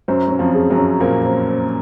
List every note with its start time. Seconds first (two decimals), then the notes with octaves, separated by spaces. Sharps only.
0.08 F#2 F#3 C5
0.28 F#3 C#4
0.39 F2 F3
0.55 G#4
0.70 F#2 F#3
0.77 C#4
1.00 A#2 A#3 C5
1.24 C5
1.47 C5